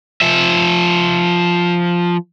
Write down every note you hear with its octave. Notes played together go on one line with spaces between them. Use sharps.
F3 E5